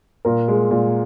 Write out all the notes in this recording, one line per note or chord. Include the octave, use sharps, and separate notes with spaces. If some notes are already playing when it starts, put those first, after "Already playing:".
A#2 A#4
G#3
A#2